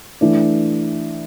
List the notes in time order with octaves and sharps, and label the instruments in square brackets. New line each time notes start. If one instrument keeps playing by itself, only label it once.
[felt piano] E3 A3 D4